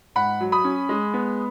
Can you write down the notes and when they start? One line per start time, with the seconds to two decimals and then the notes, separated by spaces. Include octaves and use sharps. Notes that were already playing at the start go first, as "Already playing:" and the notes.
0.15 G#2 F#5 B5
0.41 F#3
0.52 B5 D#6
0.64 C#4
0.89 G#3
1.14 B3